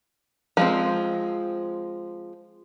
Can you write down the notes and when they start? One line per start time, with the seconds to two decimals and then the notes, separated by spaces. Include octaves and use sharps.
0.57 F3 G#3 C4